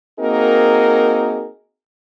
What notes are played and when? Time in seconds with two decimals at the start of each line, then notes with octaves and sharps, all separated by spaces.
0.19 A#3 C4 D#4 F#4 G#4 A#4